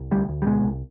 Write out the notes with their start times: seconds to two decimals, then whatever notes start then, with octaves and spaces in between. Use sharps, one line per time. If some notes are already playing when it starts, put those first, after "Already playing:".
Already playing: C2
0.11 D2 G3
0.29 D2
0.42 G3
0.46 B2 G#3
0.64 C2